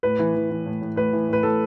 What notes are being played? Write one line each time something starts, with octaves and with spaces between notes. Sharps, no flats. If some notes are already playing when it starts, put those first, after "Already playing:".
A2 B4
E3
E3
E3
A2
A2
A2 B4
E3
A2 B4
A2 A4